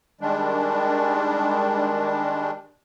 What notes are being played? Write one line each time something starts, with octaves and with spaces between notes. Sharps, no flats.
D#3 G3 G#3 D4